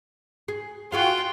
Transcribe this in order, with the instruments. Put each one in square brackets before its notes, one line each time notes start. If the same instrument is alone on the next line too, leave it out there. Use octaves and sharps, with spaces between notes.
[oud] G#4
[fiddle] F4 G5 [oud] F#4 G#4 F5